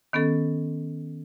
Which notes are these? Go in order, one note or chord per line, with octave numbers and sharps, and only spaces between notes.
D#3 B3 C#4 A4